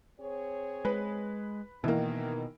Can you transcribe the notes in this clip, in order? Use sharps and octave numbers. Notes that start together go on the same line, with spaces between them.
C4 G#4 C#5
G#3 B4
B2 D#3 E3 A#3